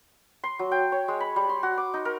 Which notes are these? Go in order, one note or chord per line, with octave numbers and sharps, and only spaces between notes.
C6
F#3
G5
C#5
G#3
B5
G3
C6
F#4
D6
D#4
A#4